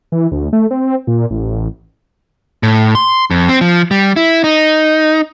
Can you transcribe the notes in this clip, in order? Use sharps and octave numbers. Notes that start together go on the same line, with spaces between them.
E3
D2
A3
C4
A#2
A1
A1
A2
C6
F2
C4
F3
G3
E4
D#4